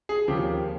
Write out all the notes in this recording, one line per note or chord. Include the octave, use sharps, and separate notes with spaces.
G#4
D#2 C#3 F3 A#3 C#4 G4